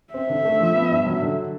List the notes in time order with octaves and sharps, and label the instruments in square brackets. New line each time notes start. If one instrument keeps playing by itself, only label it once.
[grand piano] C4 [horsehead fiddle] E5
[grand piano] D3
A3
F3
B3
G2
F#3
D3